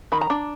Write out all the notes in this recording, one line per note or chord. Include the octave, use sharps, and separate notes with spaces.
D#3 B5
A#5
D4